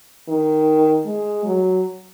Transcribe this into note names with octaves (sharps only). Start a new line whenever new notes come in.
D#3
G#3
F#3